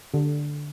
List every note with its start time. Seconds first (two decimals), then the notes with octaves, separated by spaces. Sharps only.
0.14 D3